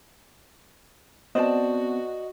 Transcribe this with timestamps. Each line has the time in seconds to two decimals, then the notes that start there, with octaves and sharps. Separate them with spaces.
1.35 B3 C4 F#4 C5 D5 D#5 A5